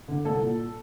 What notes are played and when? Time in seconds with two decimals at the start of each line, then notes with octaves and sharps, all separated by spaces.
0.08 D3
0.25 C2 A4
0.41 A#2